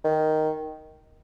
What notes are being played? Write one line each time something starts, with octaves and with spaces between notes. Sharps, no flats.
D#3